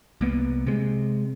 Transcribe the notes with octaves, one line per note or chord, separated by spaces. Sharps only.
C2 A#3 B3
C3 G#3